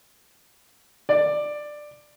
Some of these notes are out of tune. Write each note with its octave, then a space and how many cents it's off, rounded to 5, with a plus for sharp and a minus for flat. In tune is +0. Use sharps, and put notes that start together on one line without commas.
D5 +10